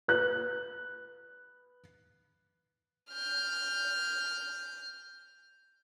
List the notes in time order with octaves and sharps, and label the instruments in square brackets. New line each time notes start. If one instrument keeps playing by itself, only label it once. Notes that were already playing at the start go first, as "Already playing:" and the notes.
[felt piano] B4 F#6
[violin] F6 G6